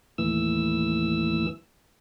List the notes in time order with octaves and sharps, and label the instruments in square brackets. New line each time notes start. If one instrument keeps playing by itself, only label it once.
[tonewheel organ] D#2 A2 E3 E6